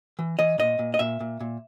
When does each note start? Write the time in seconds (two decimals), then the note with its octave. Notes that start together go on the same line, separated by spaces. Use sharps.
0.19 E3
0.39 E3 D#5
0.58 A#2 D#5
0.79 A#2
0.94 D#5
0.99 A#2 E5
1.20 A#2
1.40 A#2